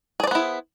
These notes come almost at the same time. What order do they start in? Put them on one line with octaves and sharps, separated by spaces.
G#4 D5 C5 B3 E4